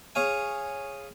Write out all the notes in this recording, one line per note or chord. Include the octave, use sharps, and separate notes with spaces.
G#4 C#5 F5 G#5